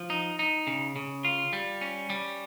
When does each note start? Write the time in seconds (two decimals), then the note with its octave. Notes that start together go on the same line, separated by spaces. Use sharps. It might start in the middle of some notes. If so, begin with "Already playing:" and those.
Already playing: F3
0.10 D#4
0.39 D#4
0.67 C#3
0.96 C#3
1.25 F4
1.53 G3
1.81 C#4
2.10 G3